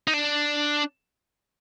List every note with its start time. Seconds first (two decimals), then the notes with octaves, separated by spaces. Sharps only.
0.08 D#4
0.14 D4